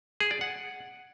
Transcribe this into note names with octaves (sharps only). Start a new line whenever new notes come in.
G#4
D5
F#5